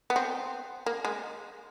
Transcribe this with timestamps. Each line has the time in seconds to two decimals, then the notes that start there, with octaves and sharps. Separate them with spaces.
0.10 B3
0.16 C4
0.86 A#3
1.05 G#3